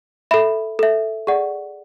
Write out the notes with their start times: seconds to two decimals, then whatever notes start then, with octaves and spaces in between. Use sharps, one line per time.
0.31 A4 E5 B5
0.79 A4 E5
1.27 G#4 D5 F#5 C#6